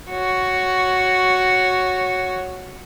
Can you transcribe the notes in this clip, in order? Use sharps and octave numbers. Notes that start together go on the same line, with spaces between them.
F#4 C#5